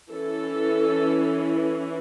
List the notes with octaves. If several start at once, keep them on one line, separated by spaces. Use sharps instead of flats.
E3 C#4 E4 A4